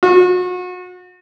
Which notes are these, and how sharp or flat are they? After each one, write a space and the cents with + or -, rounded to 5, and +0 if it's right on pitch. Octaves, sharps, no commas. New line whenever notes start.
F#4 -35